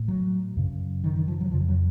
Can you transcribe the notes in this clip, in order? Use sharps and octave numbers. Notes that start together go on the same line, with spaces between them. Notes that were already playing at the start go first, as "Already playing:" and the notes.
Already playing: A2
F#3
F#2 C#3
D#3
D#3
F3
F#3
F2 C#3 F3
F#3